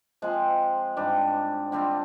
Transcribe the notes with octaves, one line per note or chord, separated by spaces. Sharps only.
F3 G#3 C4
G#2 G3 D4
D3 G3 C4 F4